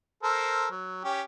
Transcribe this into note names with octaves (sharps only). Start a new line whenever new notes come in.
A4 A#4 C5
F#3
C#4 G4